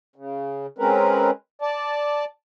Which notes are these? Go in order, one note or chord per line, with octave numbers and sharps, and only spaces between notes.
C#3
G#3 C4 C#4 A#4 B4
D5 A5